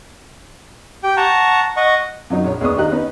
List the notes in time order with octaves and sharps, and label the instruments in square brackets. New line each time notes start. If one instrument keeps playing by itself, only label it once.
[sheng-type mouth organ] G4 G5
F#5 A5 A#5 C#6
D#5 F#5 C#6
[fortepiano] F#2 F#3 D#4
A#1 C#5
D#2 G#3 B3 D4 C#6 D#6
D#3 G4 D#5 A#5 F#6
B3 C#4 D#4 B4